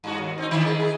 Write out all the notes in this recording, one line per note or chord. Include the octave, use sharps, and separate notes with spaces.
G2 F#4
D#2
C4 D#4
D3 D#3 E4
G#3
G#4